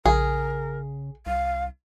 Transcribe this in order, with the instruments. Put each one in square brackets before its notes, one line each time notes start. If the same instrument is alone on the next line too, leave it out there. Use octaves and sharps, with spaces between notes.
[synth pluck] A#1 [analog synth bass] C#3 [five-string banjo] G#4 [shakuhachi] A#4
[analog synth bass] C2 [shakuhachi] F5